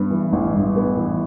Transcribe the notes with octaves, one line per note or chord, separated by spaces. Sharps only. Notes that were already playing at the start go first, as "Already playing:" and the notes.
Already playing: G2 B3
E3
A1
G2
B3
E3